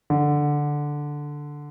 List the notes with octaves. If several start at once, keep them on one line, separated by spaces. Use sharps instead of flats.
D3